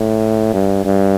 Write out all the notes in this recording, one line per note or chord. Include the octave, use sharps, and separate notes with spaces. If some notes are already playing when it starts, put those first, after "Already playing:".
Already playing: A2
G2
G2